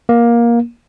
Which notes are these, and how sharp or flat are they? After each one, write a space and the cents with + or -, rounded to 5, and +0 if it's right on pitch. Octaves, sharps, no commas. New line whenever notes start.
A#3 +15